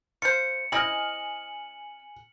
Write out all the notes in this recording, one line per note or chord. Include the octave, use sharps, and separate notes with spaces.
F4 C5 C#7
C4 E4 D#5 G#5 F6 F#7